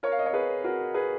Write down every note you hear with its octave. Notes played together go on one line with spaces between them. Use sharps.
A#4 C#5
F5
D#5
C#5
G#4 B4
F#4 A#4
G#4 B4